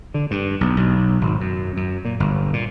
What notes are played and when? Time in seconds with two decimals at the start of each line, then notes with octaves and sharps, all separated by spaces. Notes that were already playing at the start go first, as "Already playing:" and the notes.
0.14 D3
0.31 G2
0.61 B1
0.77 B1
1.21 G#1
1.41 F#2
1.77 F#2
2.05 A#2
2.20 G1
2.53 A#2